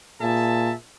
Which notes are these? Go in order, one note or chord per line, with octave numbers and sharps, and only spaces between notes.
A#2 G#4 E5 A5